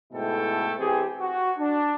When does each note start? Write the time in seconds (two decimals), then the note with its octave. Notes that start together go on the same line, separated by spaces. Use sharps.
0.13 G#2 B2 A3 E4 A4 G5
0.79 E3 C4 G4 G#4
1.20 F#4
1.58 D4